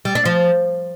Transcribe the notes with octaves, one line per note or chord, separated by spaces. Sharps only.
G3
D4
F3